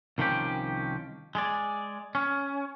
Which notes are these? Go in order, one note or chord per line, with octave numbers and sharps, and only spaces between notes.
C2 D#3 F3 C#4 G4
G#3 G#4 D5
C#4